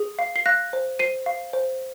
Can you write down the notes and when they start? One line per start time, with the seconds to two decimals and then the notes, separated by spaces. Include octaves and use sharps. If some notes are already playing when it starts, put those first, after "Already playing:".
Already playing: G#4
0.19 F5
0.36 C7
0.46 F5 F#6 A#6
0.73 C5
0.99 C5 C7 D#7
1.26 F5
1.53 C5